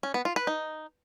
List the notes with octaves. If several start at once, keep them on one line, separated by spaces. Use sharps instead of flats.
C#4
B3
F4
B4
D#4